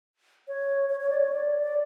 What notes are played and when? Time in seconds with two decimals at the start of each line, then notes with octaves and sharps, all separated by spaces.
0.48 C#5
0.90 C#5
1.01 C#5
1.10 D5
1.20 C#5
1.32 D5
1.63 D5